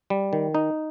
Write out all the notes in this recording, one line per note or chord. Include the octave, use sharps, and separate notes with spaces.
G3
D#3
D#4